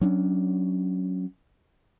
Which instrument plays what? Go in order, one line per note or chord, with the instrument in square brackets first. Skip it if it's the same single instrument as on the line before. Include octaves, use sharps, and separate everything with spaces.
[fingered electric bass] F#3 C#4 D4